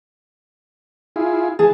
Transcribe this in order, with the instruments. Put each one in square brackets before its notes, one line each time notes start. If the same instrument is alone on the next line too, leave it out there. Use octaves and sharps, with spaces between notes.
[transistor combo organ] E4 F4 G#4
[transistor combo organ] E3 A5 [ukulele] G#4